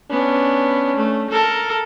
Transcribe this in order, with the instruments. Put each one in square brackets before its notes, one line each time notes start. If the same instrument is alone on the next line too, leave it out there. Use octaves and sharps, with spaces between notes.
[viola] B3 D4 [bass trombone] C#4
[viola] A3
A4 A#4